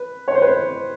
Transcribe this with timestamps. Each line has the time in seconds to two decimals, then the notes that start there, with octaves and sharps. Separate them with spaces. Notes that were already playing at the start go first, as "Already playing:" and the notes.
Already playing: B4
0.28 C#5
0.35 C5
0.42 B4
0.48 C5